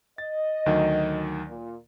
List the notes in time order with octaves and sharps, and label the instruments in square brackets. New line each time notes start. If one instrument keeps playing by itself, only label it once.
[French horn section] D#5 [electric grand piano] A6
[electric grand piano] D2 D#3 F#3
[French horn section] A#2